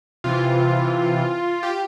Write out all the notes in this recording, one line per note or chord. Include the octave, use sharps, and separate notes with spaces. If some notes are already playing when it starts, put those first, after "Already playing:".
C3 E3 F4
G4